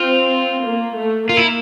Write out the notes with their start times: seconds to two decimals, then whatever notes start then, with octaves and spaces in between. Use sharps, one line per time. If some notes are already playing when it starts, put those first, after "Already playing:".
Already playing: C4 F4
0.66 A#3
0.97 A3
1.29 A#3 F4
1.37 E4